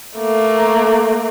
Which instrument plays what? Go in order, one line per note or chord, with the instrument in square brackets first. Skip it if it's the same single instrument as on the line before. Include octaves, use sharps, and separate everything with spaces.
[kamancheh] A3 A#3